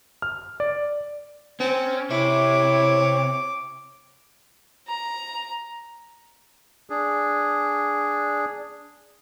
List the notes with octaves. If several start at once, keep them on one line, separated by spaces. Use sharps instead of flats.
F6
D5
C4 C#4
C3 E4 C#5 D6
A#5
D4 G#4